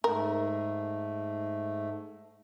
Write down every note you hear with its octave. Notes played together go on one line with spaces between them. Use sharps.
G#2 A3 A#4